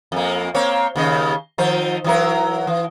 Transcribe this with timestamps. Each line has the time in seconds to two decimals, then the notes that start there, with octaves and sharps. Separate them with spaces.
0.12 F2 A#3
0.55 A#3 C4 C#5
0.96 D#2 C#3 D#5
1.58 D#3 F3 C5
2.04 E3 F#3 A#4
2.67 E3